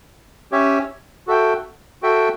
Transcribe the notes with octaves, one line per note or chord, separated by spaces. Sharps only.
C#4 G4 C#5 E5
F#4 A4 E5 G5
F#4 A4 E5 G5